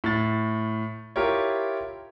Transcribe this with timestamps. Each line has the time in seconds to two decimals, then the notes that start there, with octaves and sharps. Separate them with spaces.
0.04 A2 A6
1.16 E4 F4 G4 A#4 C#5